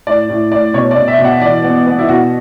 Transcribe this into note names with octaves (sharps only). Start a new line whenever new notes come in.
A2 D5
A2
A2 D5
B2 C#5
D5
B2
E5
B2
F#5
E3 D5
B3
B3
E4
B2 F#4